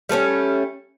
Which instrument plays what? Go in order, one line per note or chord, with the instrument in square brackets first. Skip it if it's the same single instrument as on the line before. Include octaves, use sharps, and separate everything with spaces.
[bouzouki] G3 A3 B3 C#4